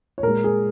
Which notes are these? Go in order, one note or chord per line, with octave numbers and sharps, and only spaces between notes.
C#5
A#2 G#3 A#4
G#4